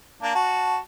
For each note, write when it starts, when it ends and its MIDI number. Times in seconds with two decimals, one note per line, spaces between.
0.22 0.35 58
0.22 0.35 62
0.35 0.77 66
0.35 0.77 81